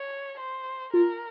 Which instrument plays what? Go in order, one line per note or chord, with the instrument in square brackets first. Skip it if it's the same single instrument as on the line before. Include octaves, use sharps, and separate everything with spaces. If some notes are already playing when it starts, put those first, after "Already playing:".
Already playing: [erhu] C#5
C5
[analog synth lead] F4 [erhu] A#4